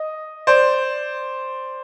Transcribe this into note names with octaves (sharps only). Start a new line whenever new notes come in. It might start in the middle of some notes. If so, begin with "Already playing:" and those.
Already playing: D#5
C5 D5